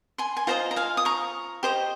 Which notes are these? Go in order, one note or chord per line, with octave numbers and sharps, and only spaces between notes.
G#5 C6
G#5
F4 C5 D#5 G5 A#5
A#5
F5 G#5
D#6
A#5 C#6
G4 C5 D#5